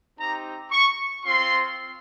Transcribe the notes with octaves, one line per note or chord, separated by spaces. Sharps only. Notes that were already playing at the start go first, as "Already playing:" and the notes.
C4 D#4 G4 A#5
C#6
C4 F4 C6